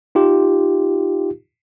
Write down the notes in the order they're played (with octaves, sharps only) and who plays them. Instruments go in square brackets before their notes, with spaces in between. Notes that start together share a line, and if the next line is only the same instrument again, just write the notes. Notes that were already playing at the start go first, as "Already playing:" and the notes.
[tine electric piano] D#4 F4 G4